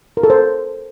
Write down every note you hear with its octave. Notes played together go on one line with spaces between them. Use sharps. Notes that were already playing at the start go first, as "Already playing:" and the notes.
A#4
A4
C5